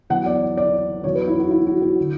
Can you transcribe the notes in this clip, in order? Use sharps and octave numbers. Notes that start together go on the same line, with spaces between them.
E2 B2 F#3 F#5
D5
D5
E2 B2 F#3 C#5
B4
E4
F#4
E4
F#4
F#4
D3